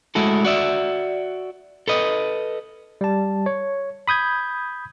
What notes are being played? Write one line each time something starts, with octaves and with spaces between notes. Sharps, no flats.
G#3 A3 E4 F#4 A4
F#4 D5 E5
A4 B4 D#5
G3 A5
C#5
B5 D#6 G6 G#6